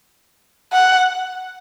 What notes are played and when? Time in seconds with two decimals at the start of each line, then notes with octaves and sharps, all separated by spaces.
0.72 F#5